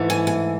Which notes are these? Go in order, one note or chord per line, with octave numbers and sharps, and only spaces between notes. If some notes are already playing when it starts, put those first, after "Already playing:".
Already playing: G#2 E3 A3
G#5
G#5